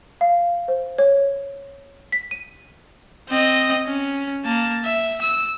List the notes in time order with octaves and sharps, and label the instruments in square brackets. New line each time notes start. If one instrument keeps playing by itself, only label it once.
[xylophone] F5
C5
C#5
B6
D#7
[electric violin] C4 D#5
C#4
A#3 A5
E5
E6